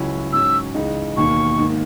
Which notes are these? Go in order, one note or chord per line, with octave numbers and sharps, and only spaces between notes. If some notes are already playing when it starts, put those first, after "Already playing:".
Already playing: C#2 C#3 F#3 C#4 E4
G#2 F#3 C#4 E6
C#2 C#3 E3 G#3 D#4
E1 D#2 D#3 A#3 C#6
G#2 D#3 A#3